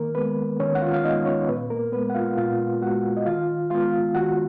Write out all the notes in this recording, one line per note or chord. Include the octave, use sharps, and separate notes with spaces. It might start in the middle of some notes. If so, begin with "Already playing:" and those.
Already playing: D#3 A#3 A#4
G#3 B3 B4
D#3 C#4 C#5
F#5
F4 F5
F5
G#3 B3 D#4 D#5
C#4 C#5
A#2 B3 B4
A#3 A#4
B3 B4
G#3
F#5
F4 F5
A#2 F4 F5
G#3 B3 F#4 F#5
D#5
D#3 F4 F5
G#3 B3 F4 F5
D#3 F#4 F#5